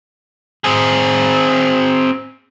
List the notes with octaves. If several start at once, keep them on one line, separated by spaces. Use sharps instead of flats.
C4 G#4